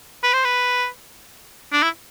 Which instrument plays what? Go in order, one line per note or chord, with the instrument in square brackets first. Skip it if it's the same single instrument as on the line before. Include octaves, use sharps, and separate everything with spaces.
[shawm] B4
C5
B4
D4
E4